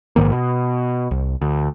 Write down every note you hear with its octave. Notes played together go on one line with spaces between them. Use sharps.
A#1 G#2 D#3 A#3
B2
C2
D2